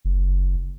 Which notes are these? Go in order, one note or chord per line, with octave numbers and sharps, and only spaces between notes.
F#1